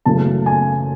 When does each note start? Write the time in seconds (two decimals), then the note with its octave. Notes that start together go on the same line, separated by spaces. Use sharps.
0.06 F#1 F#2 C#3 E3 A3 A5
0.46 G#5